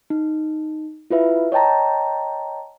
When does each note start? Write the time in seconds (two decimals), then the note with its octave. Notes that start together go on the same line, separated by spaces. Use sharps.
0.10 D#4
1.10 E4 F4 B4 E5
1.52 C#5 D#5 G5 A5 A#5